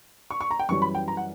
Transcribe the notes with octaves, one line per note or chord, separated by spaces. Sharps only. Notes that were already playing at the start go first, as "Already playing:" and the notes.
C#6
C#6
A#5
G5
F#2 E3 G3 C#4 C#6
B5
G5
A#5
F#5